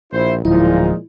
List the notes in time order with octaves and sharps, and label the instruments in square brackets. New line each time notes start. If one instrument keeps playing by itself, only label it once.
[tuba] A#1 [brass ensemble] E4 C5
[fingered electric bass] D1 [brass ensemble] A#2 G#3 D#4 [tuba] F3 [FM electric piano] E4